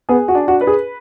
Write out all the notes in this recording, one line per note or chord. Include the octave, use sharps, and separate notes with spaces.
B3 G#4
F#4
D4
F#4
B4
G#4